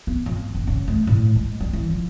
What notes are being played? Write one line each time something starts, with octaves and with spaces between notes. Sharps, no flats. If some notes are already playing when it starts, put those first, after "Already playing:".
B3
F2
G#2
F#1
C#3
A3
A2
G#3
G3
E3
F3